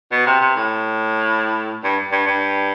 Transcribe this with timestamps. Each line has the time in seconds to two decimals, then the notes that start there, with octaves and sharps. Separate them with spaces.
0.12 B2
0.26 C3
0.41 C3
0.56 A2
1.84 G2
2.12 G2
2.27 G2